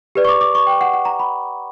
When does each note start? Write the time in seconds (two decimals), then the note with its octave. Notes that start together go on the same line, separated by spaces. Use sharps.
0.15 G4 B4 D5
0.25 C#6
0.29 D6
0.41 D6
0.55 C#6
0.67 G5
0.81 F#5
0.93 F#5
1.05 A#5
1.19 B5